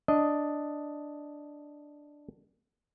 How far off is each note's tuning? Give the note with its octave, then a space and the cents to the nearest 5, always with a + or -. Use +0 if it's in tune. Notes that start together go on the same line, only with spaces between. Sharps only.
D4 +0 D#5 +0